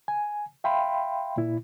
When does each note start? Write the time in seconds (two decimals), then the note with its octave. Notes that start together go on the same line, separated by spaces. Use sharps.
0.08 G#5
0.64 E5 F5 G5 B5 C6
1.37 A#2 E4